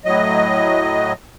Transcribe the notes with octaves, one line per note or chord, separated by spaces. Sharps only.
A2 F#3 D#5